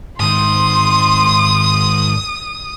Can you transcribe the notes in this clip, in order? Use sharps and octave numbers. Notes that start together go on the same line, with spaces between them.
G#2 D#3 C6 D#6